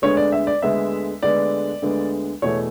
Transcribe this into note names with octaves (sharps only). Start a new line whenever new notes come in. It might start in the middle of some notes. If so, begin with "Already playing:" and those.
D2 D3 G#3 B3 C#5
D5
E5
D5
D2 D3 G#3 B3 E5
D2 D3 G#3 B3 D5
D2 D3 G#3 B3
E2 B2 A3 C#5